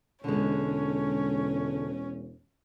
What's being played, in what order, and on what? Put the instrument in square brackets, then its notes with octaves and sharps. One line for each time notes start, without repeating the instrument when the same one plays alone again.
[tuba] E1 [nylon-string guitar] D3 G#3 [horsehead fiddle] C#4